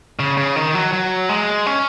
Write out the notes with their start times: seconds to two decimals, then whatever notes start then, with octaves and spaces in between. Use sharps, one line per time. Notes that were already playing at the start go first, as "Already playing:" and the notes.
0.19 C#3
0.37 C#3
0.56 D#3
0.75 F#3
0.93 F#3
1.29 G#3
1.66 C#4